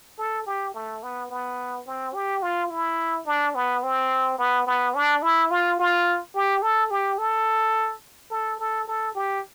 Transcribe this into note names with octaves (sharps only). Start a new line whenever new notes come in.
A4
G4
A3
B3
B3
C4
G4
F4
E4
D4
B3
C4
B3
B3
D4
E4
F4
F4
G4
A4
G4
A4
A4
A4
A4
G4